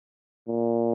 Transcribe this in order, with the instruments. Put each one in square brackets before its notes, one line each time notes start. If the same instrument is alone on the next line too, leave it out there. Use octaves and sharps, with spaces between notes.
[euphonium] A#2